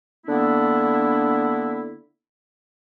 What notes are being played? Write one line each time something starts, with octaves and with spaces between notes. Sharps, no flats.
D3 A#3 B3 D4 E4